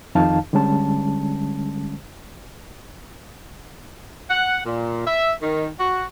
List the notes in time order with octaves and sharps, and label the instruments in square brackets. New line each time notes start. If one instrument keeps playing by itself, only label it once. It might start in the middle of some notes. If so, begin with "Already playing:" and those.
[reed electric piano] F2 D#3 D#4 F5 A5
D3 G3 G#3 C#4 A5
[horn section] F#5
A#2
E5
D#3
F#4